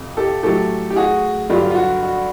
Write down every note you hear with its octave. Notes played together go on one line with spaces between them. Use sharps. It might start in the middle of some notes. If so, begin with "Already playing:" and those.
Already playing: F2 C3
G4 A4
A2 F#3 G4 A4
G4
F#4 G#4
G2 D3 F#3 F4 G4
F4
F#4
F#4